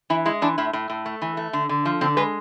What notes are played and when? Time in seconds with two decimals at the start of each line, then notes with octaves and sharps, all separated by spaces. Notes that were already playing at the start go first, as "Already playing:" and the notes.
0.10 E3 E4
0.25 G#3 E4
0.42 E3 D4
0.58 A2 E4
0.73 A2
0.90 A2
1.06 A3
1.22 E3
1.37 A3
1.53 D3
1.69 D3
1.85 F3
2.01 D3 C4
2.17 G#3 B4